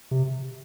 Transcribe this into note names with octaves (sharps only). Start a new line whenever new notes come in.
C3